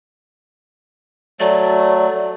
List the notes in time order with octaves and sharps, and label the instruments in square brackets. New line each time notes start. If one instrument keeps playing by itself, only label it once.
[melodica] F#3 A3 [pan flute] D5